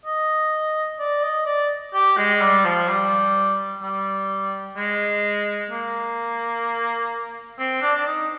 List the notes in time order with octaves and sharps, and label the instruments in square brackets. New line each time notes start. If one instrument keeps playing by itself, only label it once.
[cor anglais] D#5
D5
D#5
D5
G4
G#3
G3
F3
G3
G3
G#3
A#3
C4
D4
D4
D#4